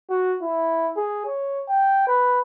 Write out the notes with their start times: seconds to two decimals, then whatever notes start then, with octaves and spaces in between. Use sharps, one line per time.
0.10 F#4
0.42 E4
0.97 G#4
1.26 C#5
1.69 G5
2.07 B4